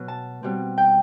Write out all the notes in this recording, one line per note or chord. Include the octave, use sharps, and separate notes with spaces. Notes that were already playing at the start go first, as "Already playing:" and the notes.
Already playing: B2 F#3 B3
A5
B2 G3 C4
G5